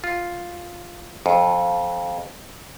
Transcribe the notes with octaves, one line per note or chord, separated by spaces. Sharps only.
F4
F2